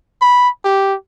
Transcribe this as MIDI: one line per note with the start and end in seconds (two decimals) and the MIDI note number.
0.21 0.49 83
0.65 0.95 67